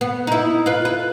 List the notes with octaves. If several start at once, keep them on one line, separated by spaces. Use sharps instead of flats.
B3
D#4 E4
F4 B4
B4